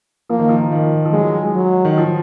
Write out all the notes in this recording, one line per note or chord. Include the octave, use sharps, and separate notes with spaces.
F3 A#3
D#3
F3
D#3
F3
F#3 G#3
F#3
D#3
F3